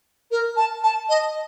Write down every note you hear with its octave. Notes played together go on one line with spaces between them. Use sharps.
A#4
A5
A5
D#5